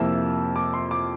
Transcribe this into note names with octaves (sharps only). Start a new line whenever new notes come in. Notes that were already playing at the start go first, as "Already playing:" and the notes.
Already playing: F2 C3 F3 A#3 E4 E6
D6
C6
D6